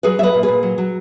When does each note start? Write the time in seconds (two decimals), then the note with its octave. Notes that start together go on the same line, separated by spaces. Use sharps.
0.03 F#3 G#4 B4
0.19 F#3 E5
0.23 B4 D#5
0.34 A#2
0.43 G#4 B4
0.48 A#2
0.63 F#3
0.78 F#3